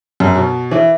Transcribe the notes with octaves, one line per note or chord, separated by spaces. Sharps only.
F#2
B2
E3